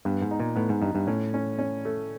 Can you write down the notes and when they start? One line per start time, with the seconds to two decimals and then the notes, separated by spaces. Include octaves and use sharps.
0.05 G2 B3
0.22 G#2
0.31 D#4
0.39 A#2
0.56 A2 B3
0.69 G#2
0.82 G2 D#4
0.95 G2
1.07 A2 C#4
1.34 C#4
1.59 C#4
1.85 A3